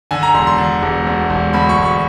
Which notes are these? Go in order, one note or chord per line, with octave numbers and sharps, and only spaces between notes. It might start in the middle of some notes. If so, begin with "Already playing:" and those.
D3 G#5
A#5
E1 C6
C6
D3
E1
D2
E1
D2 B5
C#6
E1
C#6